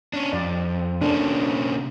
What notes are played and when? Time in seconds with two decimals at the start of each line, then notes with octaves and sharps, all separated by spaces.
0.14 C#4 D4
0.33 F2 D5
1.01 C3 A#3 C#4 D4